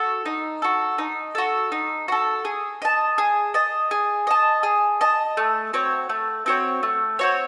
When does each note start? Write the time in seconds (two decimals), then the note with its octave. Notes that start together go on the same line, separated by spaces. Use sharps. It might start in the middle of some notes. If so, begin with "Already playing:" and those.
Already playing: F#4 A4
0.26 D#4
0.62 F#4 A4
0.98 D#4
1.35 F#4 A4
1.72 D#4
2.08 F#4 A4
2.45 G#4
2.82 D#5 A5
3.18 G#4
3.54 D#5 A5
3.91 G#4
4.27 D#5 A5
4.63 G#4
5.01 D#5 A5
5.37 A3
5.73 C4 F#4 C#5
6.09 A3
6.46 C4 F#4 C#5
6.83 A3
7.19 C4 F#4 C#5